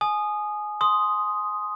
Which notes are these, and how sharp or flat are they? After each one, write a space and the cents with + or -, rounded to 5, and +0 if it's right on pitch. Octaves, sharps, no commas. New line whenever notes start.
G#5 +20 D#6 -15
C6 +0 D#6 +0